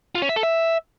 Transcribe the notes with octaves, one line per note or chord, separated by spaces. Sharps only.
F4
C#4
E5
A4
E5